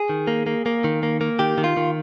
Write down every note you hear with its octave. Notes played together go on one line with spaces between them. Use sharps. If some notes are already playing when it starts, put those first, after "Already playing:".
Already playing: G#4
D#3
A#3
A#3
A#3
D#3
A#3
A#3
D#3 G4
D#3
F4
D#3